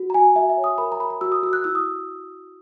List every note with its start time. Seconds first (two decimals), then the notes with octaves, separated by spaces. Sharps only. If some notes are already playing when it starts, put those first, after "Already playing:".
Already playing: F#4
0.10 A#5
0.14 F#4 G#5
0.36 F#4 E5
0.49 E5
0.57 C#5
0.64 D#6
0.78 A#4 B5
0.92 A#5
1.00 A#4 B5
1.10 B5
1.21 F#4 E6
1.32 D#6
1.43 F#4 E6
1.53 F#6
1.64 E4 E6
1.75 D#6